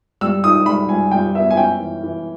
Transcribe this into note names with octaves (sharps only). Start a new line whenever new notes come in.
G3 E6
D#4 D#6
G3 B5
G3 G#5
G3 G5
B3 E5
G#5
C#4 G5
E3
E3